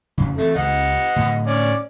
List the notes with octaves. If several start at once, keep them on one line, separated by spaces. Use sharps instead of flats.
F2 C#3
E3 A3 C4
C#2 D#5 F#5
A2 D3
C#4 D5